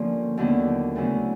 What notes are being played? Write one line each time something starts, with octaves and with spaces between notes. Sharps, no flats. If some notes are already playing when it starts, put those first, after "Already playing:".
Already playing: G2 D3 F3 A#3 C#4
D#2 D3 F#3 B3 E4
D2 C#3 F#3 B3 E4